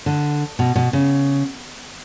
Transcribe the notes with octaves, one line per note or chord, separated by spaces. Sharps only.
D3
B2
B2
C#3